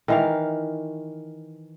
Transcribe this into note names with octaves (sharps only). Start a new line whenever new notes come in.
D#3 E3 F5